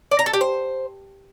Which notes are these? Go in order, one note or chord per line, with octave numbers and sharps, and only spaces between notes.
D5
A#5
A4
G4
C5